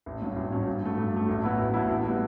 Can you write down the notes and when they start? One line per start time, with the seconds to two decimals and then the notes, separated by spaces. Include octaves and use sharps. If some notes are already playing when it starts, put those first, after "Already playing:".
0.06 A1
0.22 G2 F#3 C#4
0.36 A1
0.52 G2 F#3 C#4
0.67 G2
0.82 F#3 A3
0.98 G2
1.12 F#3 A3
1.29 A1
1.44 A2 F#3 B3 E4
1.59 A1
1.74 A2 F#3 B3 E4
1.89 A1
2.05 A2 G3 B3